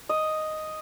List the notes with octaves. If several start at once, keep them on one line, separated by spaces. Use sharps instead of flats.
D#5